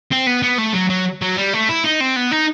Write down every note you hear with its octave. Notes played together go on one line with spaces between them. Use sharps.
C4
B3
B3
A3
F#3
F#3
F#3
G3
A3
E4
D#4
C4
B3
D#4